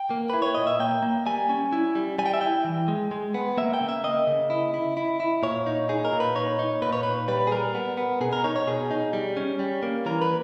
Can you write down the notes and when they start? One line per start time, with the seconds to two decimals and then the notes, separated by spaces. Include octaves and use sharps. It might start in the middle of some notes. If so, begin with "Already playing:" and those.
Already playing: G5
0.10 A#3
0.30 E4 B4
0.42 C#5
0.55 A#2 D#5
0.67 E5
0.80 A#3 G5
1.02 A#3
1.26 G3 G#5
1.49 C#4
1.73 E4
1.95 G3
2.18 G3 G#5
2.26 G5
2.34 E5
2.41 E4 G5
2.65 E3
2.88 G#3
3.11 G#3
3.34 B3
3.57 A#3 E5
3.74 G5
3.81 C#3
3.89 E5
4.04 A#3 D#5
4.27 C#3
4.50 E4
4.74 E4
4.97 E4
5.20 E4
5.43 A#2 C#5
5.66 D#4
5.89 D#4 G#4
6.05 A#4
6.12 A#2
6.20 B4
6.35 D#4 C#5
6.59 D#4
6.82 A#2 B4
6.93 C#5
7.03 A#2 B4
7.28 G3 B4
7.47 G#4
7.51 G3 A#4
7.75 B3
7.97 B3
8.21 B2 G#4
8.33 A#4
8.44 D#4 C#5
8.56 C#5
8.67 B2 G#4
8.91 D#4
9.13 G3
9.37 C#4
9.59 G3
9.83 A#3
10.06 E3 A#4
10.22 B4